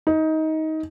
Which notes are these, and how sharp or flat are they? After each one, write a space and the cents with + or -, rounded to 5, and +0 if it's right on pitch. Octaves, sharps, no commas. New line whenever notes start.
D#4 +20